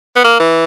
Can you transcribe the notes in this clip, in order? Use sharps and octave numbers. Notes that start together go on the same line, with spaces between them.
B3
A#3
E3